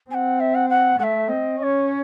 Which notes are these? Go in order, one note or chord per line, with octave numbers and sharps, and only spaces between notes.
C4 F#5 G#5
E5
F#5
F#5
A3 E5 F#5
C4 D#5
C#4 C#5 D#5